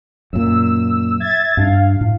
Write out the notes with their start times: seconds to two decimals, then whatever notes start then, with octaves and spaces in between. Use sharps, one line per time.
0.33 F#2 A#2 E6
1.20 E5 G#6 A6
1.57 G2 D4 F5
2.01 A2